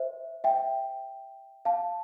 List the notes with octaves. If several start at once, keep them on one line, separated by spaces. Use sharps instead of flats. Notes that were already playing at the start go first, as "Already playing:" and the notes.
Already playing: C5 E5
E5 G5
F5 A5